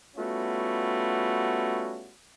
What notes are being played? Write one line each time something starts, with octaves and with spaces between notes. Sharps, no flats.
G3 A3 B3 C#4 F4 F#4